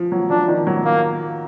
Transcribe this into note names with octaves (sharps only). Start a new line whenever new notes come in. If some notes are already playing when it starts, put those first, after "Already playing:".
Already playing: F3
F#3
F3 D4
D#3
F#3
A#3